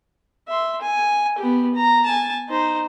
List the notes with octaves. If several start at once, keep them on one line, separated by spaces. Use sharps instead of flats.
E5 C6
G#5
B3 G4
A#5
G#5 A5
D#4 C5